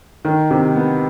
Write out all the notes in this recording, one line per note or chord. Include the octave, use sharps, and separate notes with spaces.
D#3
C3
B3